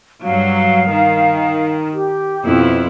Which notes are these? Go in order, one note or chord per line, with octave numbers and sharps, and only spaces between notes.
G2 F#3 F5
D#3
G4
F2 B2 E4